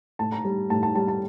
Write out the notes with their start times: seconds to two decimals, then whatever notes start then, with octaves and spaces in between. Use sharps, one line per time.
0.19 A2 A5
0.32 A#5
0.45 G3
0.70 A2 A5
0.83 A5
0.95 G3 A5
1.08 A5